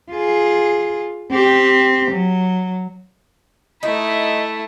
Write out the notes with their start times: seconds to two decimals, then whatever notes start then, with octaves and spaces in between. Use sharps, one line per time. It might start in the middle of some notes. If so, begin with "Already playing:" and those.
0.11 F4 G#4
1.32 C4 G4
2.12 F#3
3.83 A3 D#4 E4